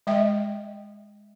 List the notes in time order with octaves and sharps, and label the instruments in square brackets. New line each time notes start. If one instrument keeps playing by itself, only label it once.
[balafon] G#3 D#5 E5 G5